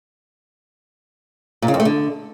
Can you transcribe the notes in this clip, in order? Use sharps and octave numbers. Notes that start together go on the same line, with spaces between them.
A#2
C#3
F2
A3
D3